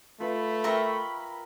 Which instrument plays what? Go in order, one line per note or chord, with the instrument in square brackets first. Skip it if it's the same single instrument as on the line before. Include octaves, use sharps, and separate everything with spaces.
[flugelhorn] A3 [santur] F4 B4 [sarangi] B5
[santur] A#4 G5 C6 [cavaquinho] E5 A#5 C#6